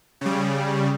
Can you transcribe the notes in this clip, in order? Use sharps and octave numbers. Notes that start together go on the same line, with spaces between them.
C#3 G3